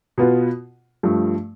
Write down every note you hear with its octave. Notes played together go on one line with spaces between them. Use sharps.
B2 B3 F4
G2 F3 A3